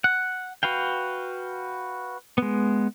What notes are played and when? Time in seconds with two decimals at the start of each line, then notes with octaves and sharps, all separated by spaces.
0.04 F#5
0.63 F#4 B4 F5 G5
2.38 G#3 B3